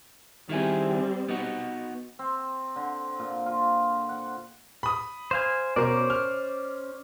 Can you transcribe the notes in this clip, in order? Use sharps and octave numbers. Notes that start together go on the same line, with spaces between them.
D#3 G3 C4 E4 G#4
B3 D#4 F#4
C4
D3
A#2
F4
F#5
B5 D#6
C5 F5 G#5
B2 C#4 A#4 C5 D5
F6